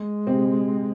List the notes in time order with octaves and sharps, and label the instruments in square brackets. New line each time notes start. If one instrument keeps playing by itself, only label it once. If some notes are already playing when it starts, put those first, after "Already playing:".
Already playing: [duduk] G#3
[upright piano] C3 C4